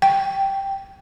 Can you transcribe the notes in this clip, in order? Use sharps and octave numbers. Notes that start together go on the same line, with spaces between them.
G5